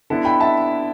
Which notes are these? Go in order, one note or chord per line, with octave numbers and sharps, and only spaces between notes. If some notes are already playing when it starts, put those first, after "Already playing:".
D3 B3 E4 A4
G5 B5
E5 A5